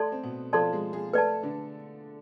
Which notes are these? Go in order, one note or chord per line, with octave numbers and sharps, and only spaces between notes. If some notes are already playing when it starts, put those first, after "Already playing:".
Already playing: A3 A4 D5 A5 C6
C4
B2 B3
F3 F4 A4 D5 A5 C6
G#3 G#4
G#3 G#4
A3 A4 B4 D5 A5
D3 D4